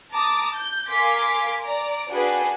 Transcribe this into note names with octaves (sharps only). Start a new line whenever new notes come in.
A5 A#5 D6 D#6
G6
A#4 F5 G#5 C6 D6 B6
D5 A#5 D7
D4 F#4 G#4 B4 G5